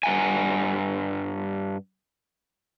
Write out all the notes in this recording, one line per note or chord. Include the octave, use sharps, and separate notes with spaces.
G2 F#5 G#5